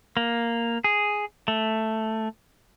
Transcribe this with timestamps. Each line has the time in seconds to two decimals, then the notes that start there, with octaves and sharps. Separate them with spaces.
0.17 A#3
0.84 G#4
1.48 A3